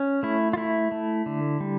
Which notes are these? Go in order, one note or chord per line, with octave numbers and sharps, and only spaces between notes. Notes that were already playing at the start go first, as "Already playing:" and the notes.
Already playing: C#4
A3 E4
F4
A3 E4
A3
D3
G3